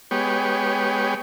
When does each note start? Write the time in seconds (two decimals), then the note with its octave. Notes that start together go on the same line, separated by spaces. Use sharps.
0.11 G#3 B3 G4 C#5